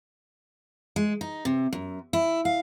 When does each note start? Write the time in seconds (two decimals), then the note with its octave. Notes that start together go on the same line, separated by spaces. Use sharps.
0.96 G#3
1.21 D#4
1.45 C3
1.73 F#2
2.13 E4
2.45 F5